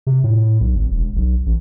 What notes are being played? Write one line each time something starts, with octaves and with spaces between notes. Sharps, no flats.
C3
A2
B1
G#1
E1
B1
A1